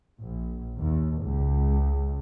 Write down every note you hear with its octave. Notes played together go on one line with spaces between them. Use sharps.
A#1
D#2
C#2